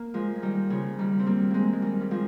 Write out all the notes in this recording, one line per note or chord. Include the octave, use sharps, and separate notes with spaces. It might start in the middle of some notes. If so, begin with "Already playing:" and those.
Already playing: A#3
F3 G#3
G#3
D#3 G3
C#3 F3
D#3 G3
C4
G3 A#3
G#3 A#3 C4
G#3
D#3 G3
G3
F3 G#3